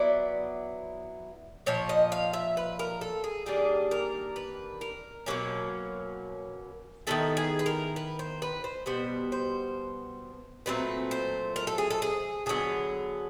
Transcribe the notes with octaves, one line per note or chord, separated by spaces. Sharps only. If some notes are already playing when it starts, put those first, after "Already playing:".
Already playing: F#3 B3 E4 D5
A#2 F3 C#5
D#5
F5
E5
B4
A#4
A4
G#4
D#3 G3 A#3 D4 G#4
A#4
B4
A#4
B2 F#3 A#3 C#4
D#3 G#3 B3 E4 A4
G#4
B4
A#4
B4
C5
B4
C5
B2 G3 B3 C5
C5
A#2 F#3 A3 C4 B4
C5
A#4
A4
G#4
A4
G#4
D3 F#3 B3 G#4